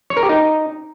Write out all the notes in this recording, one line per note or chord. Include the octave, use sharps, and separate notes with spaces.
C#5
A#4
G4
D#4